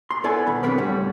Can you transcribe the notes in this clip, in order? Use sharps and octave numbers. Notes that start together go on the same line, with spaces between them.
C6
B3 E4 A4 D5 G#5
B1 D#3 B3 B5
D3 F#3 B3 C4 A#4 B4
C#2 A2 G3 F#5